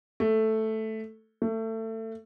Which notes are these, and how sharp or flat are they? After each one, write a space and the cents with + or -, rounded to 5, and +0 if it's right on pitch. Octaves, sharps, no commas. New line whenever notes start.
A3 +0
A3 +25